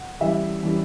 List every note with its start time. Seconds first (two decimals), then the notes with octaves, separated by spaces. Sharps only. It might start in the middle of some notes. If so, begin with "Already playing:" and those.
Already playing: F#5
0.20 E3 G3 C#4 E5
0.63 E3 G3 C#4